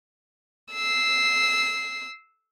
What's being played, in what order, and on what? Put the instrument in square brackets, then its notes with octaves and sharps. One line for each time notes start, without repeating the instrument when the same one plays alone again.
[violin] E6 C7